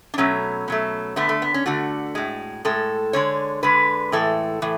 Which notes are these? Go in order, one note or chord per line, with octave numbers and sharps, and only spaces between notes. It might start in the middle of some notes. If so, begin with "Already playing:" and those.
D4
B2 F#3 A3 C#4
B2 F#3 A3
D3 A3 B3
A3
B3
C#4
D3 A3 F#4
A2 G#3
A2 G#3 A4
D3 G#3 C#5
D3 G#3 B4
A2 E3 G#3 A4
A2 E3